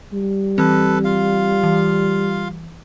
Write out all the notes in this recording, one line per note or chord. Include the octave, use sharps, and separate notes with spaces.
G3
E3 C4 A4 B4
F4 F5
E3